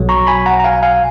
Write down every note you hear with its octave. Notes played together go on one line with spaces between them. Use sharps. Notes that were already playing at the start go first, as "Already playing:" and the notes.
Already playing: B1 B2 F#3
A#5 C#6
G#5 B5
F#5 A#5
A#5
F5 G#5
F5 G#5